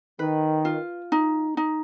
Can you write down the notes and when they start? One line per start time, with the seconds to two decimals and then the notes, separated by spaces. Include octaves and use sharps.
0.19 D#3 B4
0.65 F4
1.12 D#4
1.57 D#4